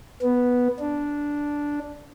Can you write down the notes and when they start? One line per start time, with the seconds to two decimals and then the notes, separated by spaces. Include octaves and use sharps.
0.22 B3
0.80 D4